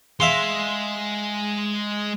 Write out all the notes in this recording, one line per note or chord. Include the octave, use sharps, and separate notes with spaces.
G#3 E5 F5 C6